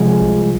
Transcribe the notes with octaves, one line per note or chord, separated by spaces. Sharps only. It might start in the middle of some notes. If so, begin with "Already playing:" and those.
Already playing: C3 F3 G#3
C2